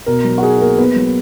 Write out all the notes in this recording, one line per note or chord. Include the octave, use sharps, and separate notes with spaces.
B2 A#4
F#3
F#4
D#4 G#4
A#3 A#4
B3 B4
F#3